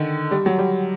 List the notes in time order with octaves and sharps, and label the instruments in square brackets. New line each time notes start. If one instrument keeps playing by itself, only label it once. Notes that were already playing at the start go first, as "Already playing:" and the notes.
Already playing: [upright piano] D3 D#3
G3
F#3
G3